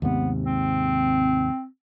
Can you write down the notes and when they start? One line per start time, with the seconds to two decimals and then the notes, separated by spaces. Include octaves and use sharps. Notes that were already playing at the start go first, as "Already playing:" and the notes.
0.02 D#2 G#2 C3 B3
0.46 C4